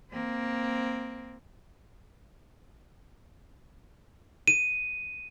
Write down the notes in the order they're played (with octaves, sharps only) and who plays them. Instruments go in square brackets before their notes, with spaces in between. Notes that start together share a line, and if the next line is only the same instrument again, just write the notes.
[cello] A#3 C4
[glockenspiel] D#7